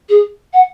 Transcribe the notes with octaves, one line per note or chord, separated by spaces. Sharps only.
G#4
F#5